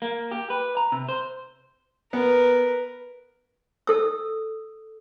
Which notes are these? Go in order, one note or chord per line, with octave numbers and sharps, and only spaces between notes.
A#3
G4
B4
A#5
C3
C5
B3 A#4 B4
A4 E6